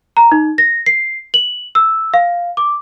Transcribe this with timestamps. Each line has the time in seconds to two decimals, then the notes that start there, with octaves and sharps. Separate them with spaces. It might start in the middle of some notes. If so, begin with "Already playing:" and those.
0.17 A#5
0.32 D#4
0.58 A#6
0.86 C7
1.34 F#7
1.75 E6
2.14 F5
2.57 D6